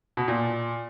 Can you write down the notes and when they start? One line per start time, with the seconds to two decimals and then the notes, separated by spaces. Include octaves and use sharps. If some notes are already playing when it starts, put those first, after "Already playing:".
0.17 B2
0.28 A#2